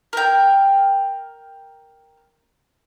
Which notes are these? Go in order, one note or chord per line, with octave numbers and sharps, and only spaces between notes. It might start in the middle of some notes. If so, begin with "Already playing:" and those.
A#4 G5